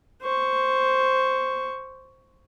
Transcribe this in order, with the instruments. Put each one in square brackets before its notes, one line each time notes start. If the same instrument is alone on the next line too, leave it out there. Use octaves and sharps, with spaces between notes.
[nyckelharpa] C5 C#6